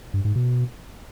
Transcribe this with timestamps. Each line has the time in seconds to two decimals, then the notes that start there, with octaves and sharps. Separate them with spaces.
0.14 G2
0.25 G#2
0.36 B2